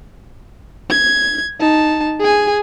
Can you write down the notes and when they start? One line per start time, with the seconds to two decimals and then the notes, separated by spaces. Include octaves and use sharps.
0.90 G#6
1.60 D#4 A5
2.20 G#4 G#5